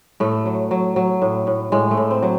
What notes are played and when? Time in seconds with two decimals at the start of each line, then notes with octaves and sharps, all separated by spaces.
0.20 A2 A3
0.46 F#3
0.71 F#3
0.96 F#3
1.22 A2
1.47 A2
1.72 A2 G#3
1.91 A3
1.97 A2
2.11 C4
2.22 F#3